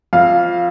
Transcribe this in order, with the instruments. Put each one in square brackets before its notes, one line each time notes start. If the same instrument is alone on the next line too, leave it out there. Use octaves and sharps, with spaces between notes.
[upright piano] F2 F5